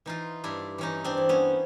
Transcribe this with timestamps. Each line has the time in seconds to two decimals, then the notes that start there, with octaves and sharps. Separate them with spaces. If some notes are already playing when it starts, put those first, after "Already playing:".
0.06 E3 D#4 F4
0.44 G2 D4 E4
0.78 E3 C#4 D#4
1.04 C4 D4
1.17 E3
1.29 B3 C#4